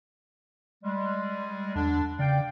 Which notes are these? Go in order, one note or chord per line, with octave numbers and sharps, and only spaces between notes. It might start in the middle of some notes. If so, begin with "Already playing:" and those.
G3 G#3
E2 D3 D4
C#3 D5 F5 G5